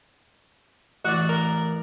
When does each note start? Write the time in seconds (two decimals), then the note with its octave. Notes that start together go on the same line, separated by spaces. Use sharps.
1.05 A1 F#4 D5
1.29 A#4